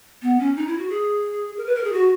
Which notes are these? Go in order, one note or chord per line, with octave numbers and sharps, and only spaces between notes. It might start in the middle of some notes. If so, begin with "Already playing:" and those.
B3
C#4
D#4
E4
F#4
G#4
A#4
B4
A#4
G#4
F#4